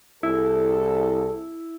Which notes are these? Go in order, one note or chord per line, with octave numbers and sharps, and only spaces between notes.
C2 E4 G#4 A4